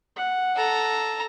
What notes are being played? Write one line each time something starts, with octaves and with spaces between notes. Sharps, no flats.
F#5
A4 A#5